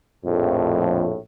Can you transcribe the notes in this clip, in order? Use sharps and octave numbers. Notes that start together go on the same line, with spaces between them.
A#1 F2 A2